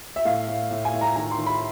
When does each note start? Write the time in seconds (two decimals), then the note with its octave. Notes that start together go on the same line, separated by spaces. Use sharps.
0.16 E5
0.25 A2 F5
0.48 A2
0.71 A2
0.85 G#5
0.93 A2
1.01 A#5
1.16 D#3 A#5
1.31 C6
1.38 D#3
1.46 B5